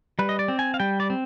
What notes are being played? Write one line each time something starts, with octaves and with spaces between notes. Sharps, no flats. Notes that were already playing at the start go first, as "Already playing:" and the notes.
G3 B4
D#5
D5
C4
G#5
F5
G3 G5
D5
C4